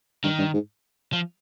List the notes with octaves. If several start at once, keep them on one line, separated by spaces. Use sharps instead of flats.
G2 D#3
G2
G#2
F3